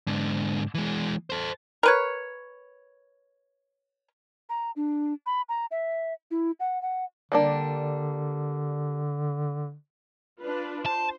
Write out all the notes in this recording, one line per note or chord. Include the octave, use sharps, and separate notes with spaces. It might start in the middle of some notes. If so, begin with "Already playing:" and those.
G#2 D3
E3 G#3
A4 C5
A#4 B4 C#5
A#5
D4
B5
A#5
E5
E4
F#5
F#5
D3 G3 A#3 D4
D4 F4 B4
C5 A5